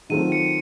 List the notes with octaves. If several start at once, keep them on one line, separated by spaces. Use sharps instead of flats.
D#3 F#3 A3 C4 F4 D#7
C#7